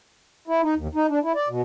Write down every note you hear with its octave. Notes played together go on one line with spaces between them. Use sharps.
E4
D#4
D#2
D#4
D4
E4
D5
B2